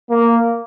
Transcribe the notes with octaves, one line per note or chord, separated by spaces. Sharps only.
A#3